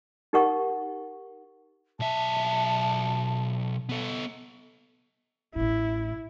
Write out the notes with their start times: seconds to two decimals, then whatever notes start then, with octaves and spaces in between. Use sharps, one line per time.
0.33 D#4 G4 A#4 F#5 C#6
2.00 B1 E5 A5
3.89 B3 A4
5.56 A1 A2 E4